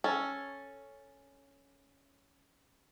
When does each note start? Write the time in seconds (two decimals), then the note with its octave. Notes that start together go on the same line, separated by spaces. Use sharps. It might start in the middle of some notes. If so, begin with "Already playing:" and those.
0.04 C#4 A4